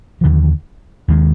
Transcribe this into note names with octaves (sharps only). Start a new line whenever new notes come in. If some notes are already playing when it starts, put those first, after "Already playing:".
D#2 D3 F3
D#2 D#3 G#3